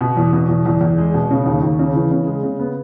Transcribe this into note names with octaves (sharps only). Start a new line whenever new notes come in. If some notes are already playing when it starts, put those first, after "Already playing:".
B2
E2
B2
E2
E2
E2
G#3
B2
C#3
D#2
D#2
C#3
E3
C#3
G#3
C#3
B3